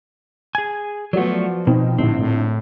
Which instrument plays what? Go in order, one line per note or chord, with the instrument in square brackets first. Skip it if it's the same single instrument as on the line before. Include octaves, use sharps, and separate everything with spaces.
[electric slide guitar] G#4 G#5
[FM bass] F3 [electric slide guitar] F#3 A3 [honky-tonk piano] B3 F#4 D5
[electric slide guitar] B2 [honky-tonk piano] C4 D#4 G5
[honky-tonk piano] A#1 D3 E4 [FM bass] A2 [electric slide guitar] C4
[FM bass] A2